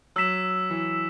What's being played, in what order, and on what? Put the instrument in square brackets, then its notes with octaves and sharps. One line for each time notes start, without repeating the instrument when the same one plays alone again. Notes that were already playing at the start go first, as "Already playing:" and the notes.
[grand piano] F#3 [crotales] E6 B6 E7
[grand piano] E3